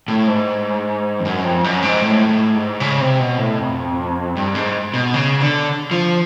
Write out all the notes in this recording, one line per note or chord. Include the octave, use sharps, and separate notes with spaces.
A2
G#2
F2
F#2
F2
F#2
G#2
A2
A2
G#2
C#3
C3
B2
A2
F2
G2
G#2
B2
C#3
D3
F3